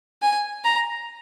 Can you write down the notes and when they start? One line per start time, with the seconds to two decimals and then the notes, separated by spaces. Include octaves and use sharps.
0.22 G#5
0.64 A#5